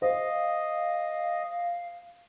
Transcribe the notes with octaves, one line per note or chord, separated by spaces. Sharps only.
C5 D#5 F5